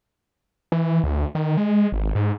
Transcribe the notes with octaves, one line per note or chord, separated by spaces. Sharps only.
E3
D2
D#3
G#3
G#1
G#2